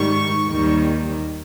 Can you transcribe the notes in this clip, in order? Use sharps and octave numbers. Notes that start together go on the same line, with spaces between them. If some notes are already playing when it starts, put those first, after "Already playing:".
Already playing: G#2 D#3 G3 C#6
D#2 D#3 G3